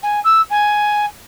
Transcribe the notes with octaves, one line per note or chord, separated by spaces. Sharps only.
G#5
E6
G#5